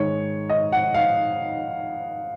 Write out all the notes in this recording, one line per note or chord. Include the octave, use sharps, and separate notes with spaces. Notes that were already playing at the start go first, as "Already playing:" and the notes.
Already playing: G#2 D#3 G#3 C#5
D#5
F#5
F5